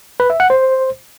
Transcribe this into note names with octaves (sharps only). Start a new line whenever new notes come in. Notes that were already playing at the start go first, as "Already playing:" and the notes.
B4
E5
F#5
C5